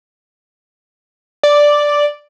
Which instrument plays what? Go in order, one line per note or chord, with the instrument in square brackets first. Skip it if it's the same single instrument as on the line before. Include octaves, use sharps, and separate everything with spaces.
[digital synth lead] D5